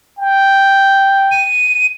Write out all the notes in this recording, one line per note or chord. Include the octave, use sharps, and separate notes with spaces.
G5
D#7